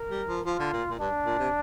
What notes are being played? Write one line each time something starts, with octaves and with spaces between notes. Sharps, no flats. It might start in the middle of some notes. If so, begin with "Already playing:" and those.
Already playing: A#4
G3
F3
F3 F4
D3
A#2
A#2
G2 D4
A#2
C3